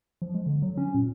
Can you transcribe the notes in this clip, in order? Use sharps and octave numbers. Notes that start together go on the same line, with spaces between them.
F3
G#3
D3
F#3
C#4
A#2